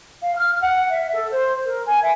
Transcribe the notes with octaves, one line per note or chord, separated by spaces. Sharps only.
F5
F6
F#5
E5
A4
C5
A#4
G#5
E5